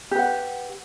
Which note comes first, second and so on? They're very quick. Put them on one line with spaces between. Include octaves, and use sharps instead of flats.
G4 B4 F#5